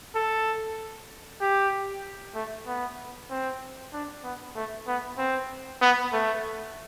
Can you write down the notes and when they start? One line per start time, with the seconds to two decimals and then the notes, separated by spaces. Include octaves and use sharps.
0.15 A4
1.41 G4
2.35 A3
2.67 B3
3.30 C4
3.93 D4
4.23 B3
4.56 A3
4.87 B3
5.18 C4
5.81 B3
6.13 A3